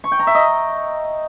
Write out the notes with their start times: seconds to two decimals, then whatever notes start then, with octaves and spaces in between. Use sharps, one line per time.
0.04 C#6
0.12 G5
0.19 A#5
0.27 E5
0.35 D#5